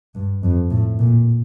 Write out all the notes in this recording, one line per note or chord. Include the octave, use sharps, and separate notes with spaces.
G2
F2
A2
A#2